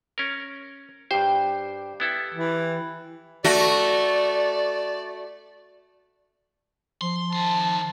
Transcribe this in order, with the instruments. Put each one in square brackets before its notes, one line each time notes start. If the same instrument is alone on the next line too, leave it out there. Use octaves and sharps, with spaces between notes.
[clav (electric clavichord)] C#4 A#4
[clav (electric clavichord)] G2 C5 [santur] G4
[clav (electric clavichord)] B3 E4 A4
[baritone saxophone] E3
[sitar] A3 F#4 [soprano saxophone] D5
[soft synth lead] F3 [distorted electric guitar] C6
[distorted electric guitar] D#3 C6 [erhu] A5